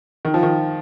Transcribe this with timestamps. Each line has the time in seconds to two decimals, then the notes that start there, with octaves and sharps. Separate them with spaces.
0.25 D#3
0.34 F3
0.43 D#3